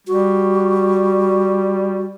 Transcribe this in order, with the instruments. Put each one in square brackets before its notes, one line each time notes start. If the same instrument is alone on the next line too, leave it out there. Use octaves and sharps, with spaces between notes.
[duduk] G3 [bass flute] F#4